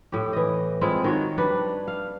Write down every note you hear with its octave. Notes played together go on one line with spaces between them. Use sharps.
A2 G4
E3 D#5
G#3 C4 E4 F4
D#3 F#4 C#5
G3 D4 B4
F5